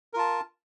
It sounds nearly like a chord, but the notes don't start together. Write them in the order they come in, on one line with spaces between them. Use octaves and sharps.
A#4 F4 A5